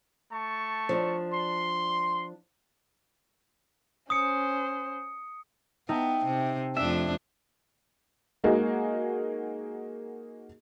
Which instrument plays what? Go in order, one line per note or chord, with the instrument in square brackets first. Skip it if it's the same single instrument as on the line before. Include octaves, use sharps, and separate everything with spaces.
[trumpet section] A3 A5 C#6
[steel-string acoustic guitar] F3 D4
[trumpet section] C6
[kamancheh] C#4 C5 [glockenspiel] D#6 C#7
[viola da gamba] B3 [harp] D#4 [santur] E5 G5 A5
[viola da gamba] C3
[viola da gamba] F2 A3 D4 [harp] E5 [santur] G#5
[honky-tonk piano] G#3 A#3 D#4 F#4 G#4